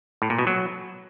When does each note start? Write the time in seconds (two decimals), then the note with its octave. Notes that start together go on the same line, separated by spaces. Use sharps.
0.22 A2
0.30 A#2
0.38 B2
0.47 F#3